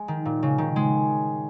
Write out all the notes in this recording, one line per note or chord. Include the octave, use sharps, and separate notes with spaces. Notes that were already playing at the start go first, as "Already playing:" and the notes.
Already playing: G#3
D#3
A#2
C#3
D#3
G#3